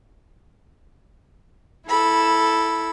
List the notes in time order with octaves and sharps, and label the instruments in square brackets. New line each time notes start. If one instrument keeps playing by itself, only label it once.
[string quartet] E4 A4 B5 E6